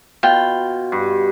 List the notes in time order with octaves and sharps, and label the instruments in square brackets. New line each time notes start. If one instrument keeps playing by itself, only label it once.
[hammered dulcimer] B2 [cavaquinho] F4 G5
[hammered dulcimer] G2